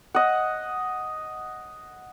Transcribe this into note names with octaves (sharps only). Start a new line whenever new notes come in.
D#5 F#5